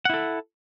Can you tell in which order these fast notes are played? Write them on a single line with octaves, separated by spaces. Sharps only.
F#5 E4 A4